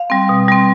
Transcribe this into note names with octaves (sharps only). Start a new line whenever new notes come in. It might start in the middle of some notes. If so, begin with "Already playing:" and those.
Already playing: F5
G3 C4
B2
G3 C4